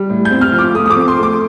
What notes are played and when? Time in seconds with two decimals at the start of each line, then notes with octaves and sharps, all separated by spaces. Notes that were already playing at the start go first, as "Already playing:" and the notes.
Already playing: G3
0.10 A2
0.25 G6
0.31 C4
0.41 F6
0.53 F3
0.58 D6
0.74 A3 D#6
0.86 D#6
0.90 D6
0.97 C4
1.08 C6
1.19 A3 D6